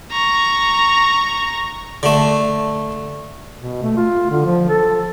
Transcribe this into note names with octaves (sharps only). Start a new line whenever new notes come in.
A#5 C#6
D3 A3
B2
A3
F4
D3
F3
A4